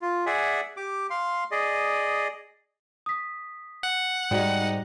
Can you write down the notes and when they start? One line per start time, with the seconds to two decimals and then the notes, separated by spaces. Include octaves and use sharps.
0.02 F4
0.26 G#4 D5 E5 F#5 G#5
0.77 G4 D6
1.10 F5 C6
1.51 G#4 D5 D#5
3.06 D#6 B6
3.83 F#5
4.31 G#2 G3 D#4 F#4 D5 G5